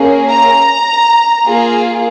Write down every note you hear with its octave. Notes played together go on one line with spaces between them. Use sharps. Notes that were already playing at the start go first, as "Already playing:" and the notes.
Already playing: A#3 C#4 G#4
A#5
A#3 F4 G#4